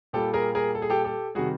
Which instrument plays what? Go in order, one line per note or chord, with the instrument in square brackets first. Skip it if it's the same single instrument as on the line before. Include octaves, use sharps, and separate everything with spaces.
[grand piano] A#2 G3 G4 A4
G#4 A#4
G#4 A#4
A4
G#4
G4 A4
G4 A4
C3 D#3 G3 F#4 G#4